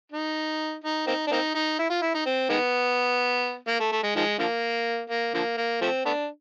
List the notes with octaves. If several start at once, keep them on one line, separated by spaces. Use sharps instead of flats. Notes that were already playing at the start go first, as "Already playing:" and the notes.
D#4
D#4
A#3 C4 D#4
D4
A#3 C4 D#4
D#4
E4
F4
E4
D#4
C4
D#3 G#3 B3
A#3
A3
A3
G#3
D#3 F3 G#3
D3 F3 A#3
A#3
D3 F3 A#3
A#3
F3 A3 C4
A3 B3 D4